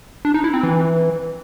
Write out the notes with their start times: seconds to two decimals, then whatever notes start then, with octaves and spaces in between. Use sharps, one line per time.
0.25 D4
0.34 D#4
0.44 E4
0.54 C4
0.63 E3